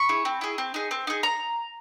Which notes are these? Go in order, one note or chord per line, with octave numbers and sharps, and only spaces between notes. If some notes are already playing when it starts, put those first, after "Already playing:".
Already playing: B5 C#6
E4 G#4
C4
E4 G#4
C4
D#4 G#4
C4
D#4 G#4
A#5